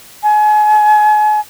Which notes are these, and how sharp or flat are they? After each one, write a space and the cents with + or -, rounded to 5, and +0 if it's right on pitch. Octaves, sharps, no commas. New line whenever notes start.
G#5 +35